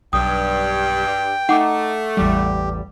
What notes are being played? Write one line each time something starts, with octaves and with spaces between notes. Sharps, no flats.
B1 G2 G5 D#6
A3 D#4 F#5 D6
A1 E2 G3 G4